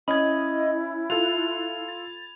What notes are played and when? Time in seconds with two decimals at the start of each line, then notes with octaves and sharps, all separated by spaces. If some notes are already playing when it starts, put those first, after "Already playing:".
0.08 C#4 E4 D#5 B5 G#6
1.10 F4 A4 F#6 F7
1.88 A6